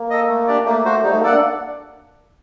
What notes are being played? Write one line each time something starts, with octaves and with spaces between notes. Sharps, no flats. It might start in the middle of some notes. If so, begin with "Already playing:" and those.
Already playing: A#3
A4 D#5
A3
D4 G4 D5
A3 A#3
F#4 C5
G3 D#4
A3
A#3 A4 D5 F#5
D4